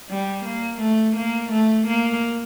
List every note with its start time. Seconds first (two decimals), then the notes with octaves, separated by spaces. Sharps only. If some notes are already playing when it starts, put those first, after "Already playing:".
0.09 G3
0.45 A#3
0.81 A3
1.16 A#3
1.52 A3
1.87 A#3